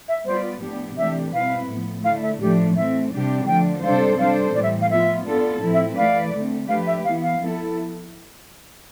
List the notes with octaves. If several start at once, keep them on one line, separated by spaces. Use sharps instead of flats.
E5
G3 B3 F4 B4 C5 D5
A2 F3 B3 D4 G4
C3 E3 A3 D4 G4 E5
B2 G3 C4 E4 B4 F5
A2 F3 B3
D3 A3 E4 F5
E5
A2 F3 A3 D4 G4
E3 A3 C4 E5
C3 G3 D4 G4
D3 F3 A3 D4 G5
C3 G3 D4 A4 C5 F5
G3 D4 A4 C5 F5
A2 E3 G3 D5
E5
F5
F3 B3 F4 E5
B3 D4 F4 A4
A2 F3 C4 E4
E5
E3 A3 E4 B4 D5 F5
D3 A3 C4
F3 A3 D4 G4 B4 F5
E5
E3 B3 E4 F5
F5
F3 B3 E4 A4